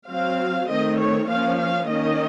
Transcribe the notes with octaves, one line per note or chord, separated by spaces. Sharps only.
F#3 C4 F5
D#3 A3 C4 D#5
C#5
F3 A#3 C#4 F5
F5
D#3 A#3 C#4 D#5